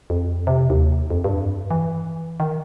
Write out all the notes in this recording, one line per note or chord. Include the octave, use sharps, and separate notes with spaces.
F2
C3
D#2
F2
G2
E3
D#3